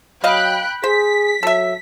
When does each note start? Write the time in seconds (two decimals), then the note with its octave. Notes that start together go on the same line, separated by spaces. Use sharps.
0.24 F#3 D#5 F5 G5 B5 F#6
0.84 G#4 C5 B6
1.43 F#3 A4 E5